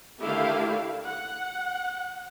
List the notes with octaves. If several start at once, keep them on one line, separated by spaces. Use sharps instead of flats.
D3 D#3 A3 E4 G4 F5
F#5